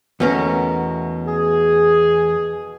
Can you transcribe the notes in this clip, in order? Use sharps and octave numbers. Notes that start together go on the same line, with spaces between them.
E2 B2 A3 C#4 A#4
G#4